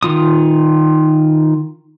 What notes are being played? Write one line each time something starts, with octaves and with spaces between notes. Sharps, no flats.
D#3 F4 D#6